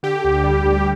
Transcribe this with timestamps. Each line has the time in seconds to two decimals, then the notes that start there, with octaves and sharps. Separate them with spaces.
0.03 D3 G4
0.24 D2
0.44 G3
0.65 D2